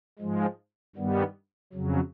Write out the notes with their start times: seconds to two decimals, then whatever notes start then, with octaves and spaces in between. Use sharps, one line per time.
0.19 G#2 F3 G#3
0.96 G2 D#3 G3 B3
1.73 F2 C#3 F#3